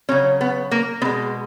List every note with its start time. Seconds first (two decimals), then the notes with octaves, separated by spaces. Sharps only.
0.09 C#3 F#3 C#4
0.41 B3
0.71 A#3
1.02 B2 G#3 B3